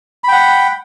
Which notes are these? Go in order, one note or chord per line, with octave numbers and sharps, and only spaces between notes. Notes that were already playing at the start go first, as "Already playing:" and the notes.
F#5 G5 B5